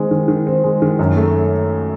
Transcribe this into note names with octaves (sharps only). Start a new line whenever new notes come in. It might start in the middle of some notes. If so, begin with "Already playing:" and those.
Already playing: D#3 G#3 C4
D#3
D#3
C4
G#3
D#3
F#2
A3